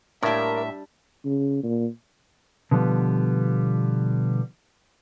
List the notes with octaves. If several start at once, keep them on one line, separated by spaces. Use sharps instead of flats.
A2 G3 A#3 D4 A#4 E5
C#3
A#2
B2 D3 F3 G3 B3